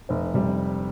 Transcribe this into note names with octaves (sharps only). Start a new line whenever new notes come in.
F1 C5
C3 G3